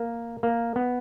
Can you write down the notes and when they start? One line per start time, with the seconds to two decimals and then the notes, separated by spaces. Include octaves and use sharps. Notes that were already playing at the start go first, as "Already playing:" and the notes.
Already playing: A#3
0.43 A#3
0.76 B3